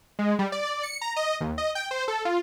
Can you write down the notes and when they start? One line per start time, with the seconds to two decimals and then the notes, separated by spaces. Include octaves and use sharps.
0.19 G#3
0.39 G3
0.52 D5
0.83 C#7
1.01 A#5
1.16 D#5
1.41 D#2
1.58 D#5
1.75 G5
1.91 C5
2.08 A4
2.25 F4